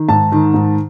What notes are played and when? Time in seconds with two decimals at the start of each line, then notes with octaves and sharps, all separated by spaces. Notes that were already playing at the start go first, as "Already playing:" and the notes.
Already playing: D#3
0.09 G#2 A5
0.32 D#3
0.54 G#2